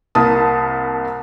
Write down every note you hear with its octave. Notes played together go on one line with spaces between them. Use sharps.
C2 A#3 A5 D#6